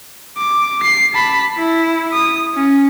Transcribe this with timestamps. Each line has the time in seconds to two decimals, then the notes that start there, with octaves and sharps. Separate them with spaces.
0.38 D6
0.83 C7
1.13 A5 B5
1.57 E4
2.13 D#6
2.54 C#4